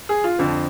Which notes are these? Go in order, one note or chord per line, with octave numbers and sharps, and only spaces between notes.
G#4
F4
F2 D3 F3